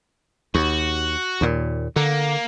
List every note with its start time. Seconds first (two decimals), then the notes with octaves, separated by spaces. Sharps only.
0.55 D#2 F#4
1.41 D#2 A#2
1.96 D3 A#3